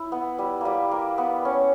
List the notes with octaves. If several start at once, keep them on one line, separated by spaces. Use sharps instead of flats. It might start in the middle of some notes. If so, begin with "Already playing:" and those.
Already playing: E4
B3
G3
G3 A#3
A#3
B3
C#4